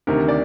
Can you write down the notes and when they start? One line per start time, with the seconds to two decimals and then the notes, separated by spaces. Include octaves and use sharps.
0.07 D2 C3 D#3 A#4
0.28 D5